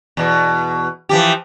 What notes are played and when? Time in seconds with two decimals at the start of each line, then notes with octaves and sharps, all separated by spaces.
0.17 E2 B2
1.09 E3 F3 G4